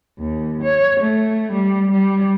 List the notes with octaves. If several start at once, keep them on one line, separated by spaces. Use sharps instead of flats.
D#2
C#5
A3
G3
G3